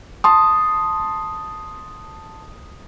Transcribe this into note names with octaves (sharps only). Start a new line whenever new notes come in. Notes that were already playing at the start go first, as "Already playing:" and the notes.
A5 C6 D#6